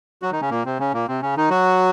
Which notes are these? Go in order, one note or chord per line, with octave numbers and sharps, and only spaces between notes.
F#3 F#4
D#3 D#4
C#3 C#4
A#2 A#3
C3 C4
C#3 C#4
A#2 A#3
C3 C4
C#3 C#4
D#3 D#4
F#3 F#4